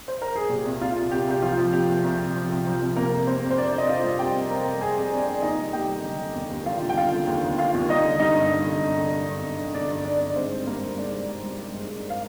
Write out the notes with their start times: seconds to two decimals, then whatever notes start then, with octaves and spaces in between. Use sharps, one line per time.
0.08 C5
0.22 A#4
0.36 G#4
0.49 A#2 G4
0.65 C2
0.81 C2 F4
0.96 C2
1.11 C2 G4
1.27 C2 G4
1.42 F3 F4
1.57 F3
1.73 C2 G4
1.89 C2
2.03 C2
2.19 C2
2.35 F3
2.50 C2
2.66 F3
2.81 C2
2.96 C3 A#3 A#4
3.12 F2
3.27 C3 C4 C5
3.43 F2
3.51 C5
3.57 C3 D4 D5
3.73 F2 D#5
3.89 F2 F4 F5
4.04 G3
4.19 F2 G4 G5
4.35 C3
4.50 G3 A#4 A#5
4.65 F2
4.81 F2 G#4 G#5
4.97 F2
5.11 F2 D4 D5
5.27 F2
5.42 D#2 D#4 D#5
5.59 G3
5.73 D#2 G4 G5
5.89 G3
6.05 D3
6.20 D3
6.35 D#2
6.50 D#2
6.66 G3 F4 F5
6.82 D3
6.90 G5
6.96 D3 F4 F5
7.13 D3
7.27 D#2
7.44 D#2
7.58 D#2 F4 F5
7.74 D#2
7.89 G3 D#4 D#5
8.04 D3
8.20 G3 D#4 D#5
8.35 G2
8.51 G3
8.66 D3
8.82 G2
8.97 D3
9.12 G2
9.29 G2
9.43 G2
9.58 D3
9.74 D3 D4 D5
9.90 G2
10.05 G2 D4 D5
10.21 G2
10.36 G#2 C4 C5
10.52 G3
10.67 G3 A#3 A#4
10.82 G3
10.98 G#2 D4 D5
11.13 G3
11.29 G3
11.43 G3
11.58 G3
11.74 G#2
11.89 G#2
12.10 F5